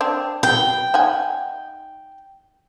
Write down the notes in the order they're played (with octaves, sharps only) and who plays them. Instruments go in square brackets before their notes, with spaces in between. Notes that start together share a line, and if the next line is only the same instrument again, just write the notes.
[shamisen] C4 D4
[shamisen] F#3 B3 [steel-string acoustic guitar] G5
[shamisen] D#4 F#5 G#5